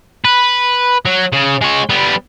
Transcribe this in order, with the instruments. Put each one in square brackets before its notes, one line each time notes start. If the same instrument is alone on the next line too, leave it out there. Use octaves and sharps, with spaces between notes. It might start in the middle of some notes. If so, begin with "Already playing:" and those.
[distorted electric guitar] B4
F#3
C#3
G#3 C#5
G3 B3